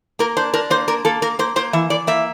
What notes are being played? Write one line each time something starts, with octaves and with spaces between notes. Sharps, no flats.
A#3 A#4
D4 C5
D4 A#4
A#3 C5
A#3 A#4
A#3 A4
A#3 A#4
A#3 C5
A#3 C5
E3 E5
E3 D5
A#3 E5